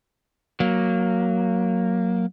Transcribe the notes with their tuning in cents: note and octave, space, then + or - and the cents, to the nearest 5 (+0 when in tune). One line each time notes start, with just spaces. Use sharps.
F#3 +0 A#3 +0